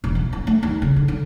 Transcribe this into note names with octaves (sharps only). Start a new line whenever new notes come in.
E1
E3
E4
A3
D#2
C#3
D3
D3